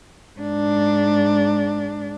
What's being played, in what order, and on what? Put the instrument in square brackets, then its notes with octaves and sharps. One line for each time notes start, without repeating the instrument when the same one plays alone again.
[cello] G#2 D4